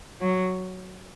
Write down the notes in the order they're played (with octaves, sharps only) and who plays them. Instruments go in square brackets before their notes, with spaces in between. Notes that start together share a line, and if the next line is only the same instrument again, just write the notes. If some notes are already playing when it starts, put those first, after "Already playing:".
[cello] F#3